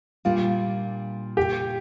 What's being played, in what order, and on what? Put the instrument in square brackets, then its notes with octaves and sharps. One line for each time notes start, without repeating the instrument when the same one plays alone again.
[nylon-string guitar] A#2 G3 A#3 D4 [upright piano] F4
[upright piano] G4